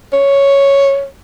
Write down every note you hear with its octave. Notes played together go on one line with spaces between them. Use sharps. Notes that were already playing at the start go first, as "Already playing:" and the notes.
C#5